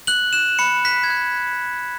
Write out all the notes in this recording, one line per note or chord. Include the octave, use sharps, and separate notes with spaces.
F#6 F#7
F#6 E7
B5 C#7
F#6 B6
G#6
F#6